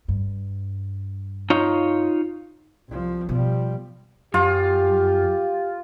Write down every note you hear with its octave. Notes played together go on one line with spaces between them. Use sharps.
G2
D#4 F4 C#5
C2 F3
B2 F3 G3
F#2 F4 G4